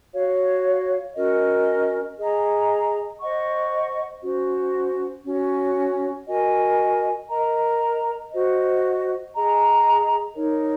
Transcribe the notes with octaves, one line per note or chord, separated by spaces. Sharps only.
F#4 C#5 F5
C#4 F#4 A#4 D#5
G#4 D#5 A#5
C5 D#5 F#5 C#6
C#4 F#4 C5
C#4 F#4 C#5
F#4 A#4 D#5 G#5
A#4 D#5 A#5
F#4 C5 D#5
G#4 D#5 A#5
D#4 A#4 C#5